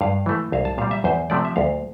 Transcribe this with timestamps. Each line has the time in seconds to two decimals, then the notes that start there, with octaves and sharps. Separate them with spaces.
0.01 G2 F5
0.26 E3 A3
0.52 C2 F5
0.65 A5
0.78 A#2 G3 F5
0.91 E5
1.04 E2 C5
1.30 C3 F3 A3 D5
1.45 E5
1.56 D2 F5